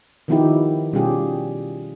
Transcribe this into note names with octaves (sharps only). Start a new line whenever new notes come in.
D#3 F3 B3 D#4 E4 G4
B2 G3 C#4 F4 G4 G#4